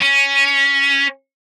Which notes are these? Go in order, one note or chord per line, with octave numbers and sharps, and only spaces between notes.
C#4